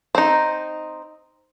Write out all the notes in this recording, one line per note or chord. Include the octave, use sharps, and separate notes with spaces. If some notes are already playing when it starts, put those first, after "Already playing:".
C4 D#4